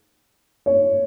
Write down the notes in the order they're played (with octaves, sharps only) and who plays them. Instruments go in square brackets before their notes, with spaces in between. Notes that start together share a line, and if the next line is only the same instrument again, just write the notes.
[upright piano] C#5